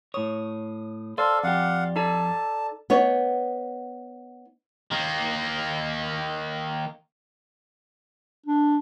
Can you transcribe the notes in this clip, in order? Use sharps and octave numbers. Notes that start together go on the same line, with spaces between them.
A2 C#5 D#6
A4 C5 D5 F5
F2 G4 F5 F#5
D#4 A4 D5 A5
B3 D#4 C#5
D#3 A#3
D4